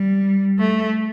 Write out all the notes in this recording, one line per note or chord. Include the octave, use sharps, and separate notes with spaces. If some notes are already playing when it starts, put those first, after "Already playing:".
Already playing: G3
A3